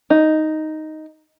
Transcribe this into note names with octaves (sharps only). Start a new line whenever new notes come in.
D#4